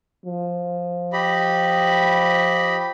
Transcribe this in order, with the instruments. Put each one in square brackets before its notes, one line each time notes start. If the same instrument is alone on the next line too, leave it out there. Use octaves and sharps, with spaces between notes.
[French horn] F3
[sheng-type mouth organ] G4 D#5 B5